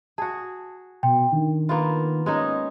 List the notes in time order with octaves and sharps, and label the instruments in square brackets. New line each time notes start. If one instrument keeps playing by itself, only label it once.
[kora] F#4 G#4 [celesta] A5
[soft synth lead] B2 [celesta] G5 C6
[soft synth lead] D#3 [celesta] D4
[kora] A#3 B3 F4
[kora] G#3 C#4 D#4 [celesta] D#5